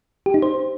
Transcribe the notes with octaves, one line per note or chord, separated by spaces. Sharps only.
G4
D#4
C5